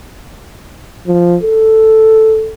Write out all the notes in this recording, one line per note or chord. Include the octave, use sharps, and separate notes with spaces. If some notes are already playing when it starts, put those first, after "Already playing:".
F3
A4